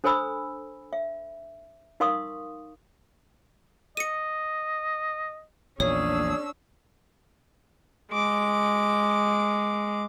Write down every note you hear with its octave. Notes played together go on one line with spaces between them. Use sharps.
D4 A4 C5 G#5 B5 E6
E5
D#4 A#4 F5 C6 C#6 D#6
D#5 C#7 D#7
A#1 E2 A#2 C#4 D4 G#4 C#5 E6
G#3 D6